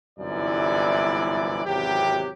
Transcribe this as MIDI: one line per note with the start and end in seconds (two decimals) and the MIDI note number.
0.19 1.62 31
0.19 1.62 36
0.19 1.62 42
0.19 1.62 52
0.19 1.62 64
0.19 1.62 74
1.65 2.29 32
1.65 2.29 40
1.65 2.29 48
1.65 2.29 54
1.65 2.29 67